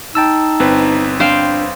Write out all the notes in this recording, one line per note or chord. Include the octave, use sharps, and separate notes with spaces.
D#4 G5 A5 E6
G1 C4 B4
D4 C5 F5 G5